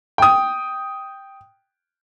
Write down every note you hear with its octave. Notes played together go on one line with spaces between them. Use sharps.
G5 D#6